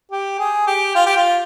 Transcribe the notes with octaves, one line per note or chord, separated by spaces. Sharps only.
G4
G#4
G4
F4
G4
F4